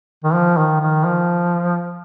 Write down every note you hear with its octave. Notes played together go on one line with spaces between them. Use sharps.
D#3
F3
D#3
D#3
F3